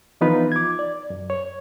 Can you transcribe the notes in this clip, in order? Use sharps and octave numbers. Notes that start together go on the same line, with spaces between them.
E3 F3 B3 D#4 F4 B4
D6 G#6
D5
F#2
C#5